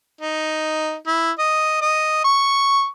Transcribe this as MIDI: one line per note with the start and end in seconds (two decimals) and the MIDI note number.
0.21 0.95 63
1.07 1.31 64
1.39 1.80 75
1.81 2.20 75
2.24 2.87 85